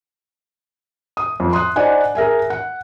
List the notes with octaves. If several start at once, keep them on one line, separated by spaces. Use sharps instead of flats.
D#6
F2
C6 D#6 F#6
D4 D#4 C5 F#5 G#5
G#4 A#4 E5 G#5
F#5